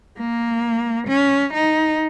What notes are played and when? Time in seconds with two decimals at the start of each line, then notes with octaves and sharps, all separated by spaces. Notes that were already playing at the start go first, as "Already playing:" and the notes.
0.18 A#3
1.08 C#4
1.54 D#4